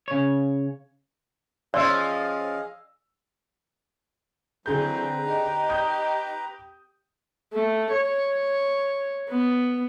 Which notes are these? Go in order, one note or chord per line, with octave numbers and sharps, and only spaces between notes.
C#3 C#5
F3 C#4 G#4 D5 D#5 F5 C6 E6
D3 E3 F#3 C4 G#4 B4 A#5 G6
D#4 G4
D#6 G6
A3
C#5
B3